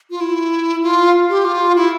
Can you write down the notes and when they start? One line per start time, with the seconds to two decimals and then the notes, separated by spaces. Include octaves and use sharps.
0.10 F4
0.21 E4
0.83 F4
1.29 G4
1.45 F4
1.76 E4